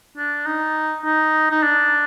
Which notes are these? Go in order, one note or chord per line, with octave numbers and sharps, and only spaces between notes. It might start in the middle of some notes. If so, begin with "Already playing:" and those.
D4
D#4
D#4
D#4
D4